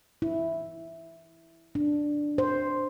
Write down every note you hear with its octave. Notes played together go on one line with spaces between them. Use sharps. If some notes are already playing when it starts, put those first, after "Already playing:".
E4
D4
C5